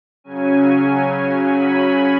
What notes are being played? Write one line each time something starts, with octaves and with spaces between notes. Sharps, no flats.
C#3 F#3 C#4 G#5
B5